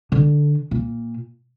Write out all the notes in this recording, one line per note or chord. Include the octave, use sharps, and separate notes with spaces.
D3
A#2